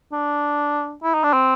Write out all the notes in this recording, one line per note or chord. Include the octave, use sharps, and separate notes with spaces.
D4
E4
D#4
D4
C4